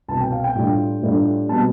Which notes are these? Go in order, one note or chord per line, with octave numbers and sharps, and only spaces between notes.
C2 B2 B3 A5
G5
F5
G5
A2 G3 D4 F4
A2 G3 D4 F4
B2 G3 C4 A5